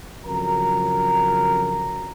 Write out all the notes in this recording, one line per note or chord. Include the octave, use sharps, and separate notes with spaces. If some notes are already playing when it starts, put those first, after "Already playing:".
F2 C#3 F#3 A#4 A#5